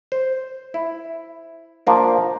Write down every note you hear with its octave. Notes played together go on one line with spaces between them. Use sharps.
C5
E4
F3 A#3 D4